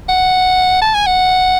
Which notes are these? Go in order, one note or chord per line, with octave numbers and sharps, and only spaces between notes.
F#5
A5
G#5
F#5